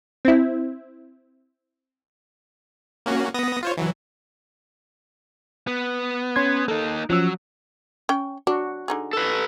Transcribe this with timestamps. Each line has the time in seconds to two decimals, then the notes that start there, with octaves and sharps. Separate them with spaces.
0.25 C4 E4
3.06 A#3 C#4 F#4
3.34 B3 D#6 A#6
3.63 F4 C5 C#5
3.77 E3 F#3
5.67 B3
6.36 C#4 C6 G#6
6.68 A#3 D#4 A4
7.10 F3 F#3 C#4 E6
8.09 C#4 G5
8.47 D4 F#4
8.88 D3 D#4 G#4
9.13 A4 B4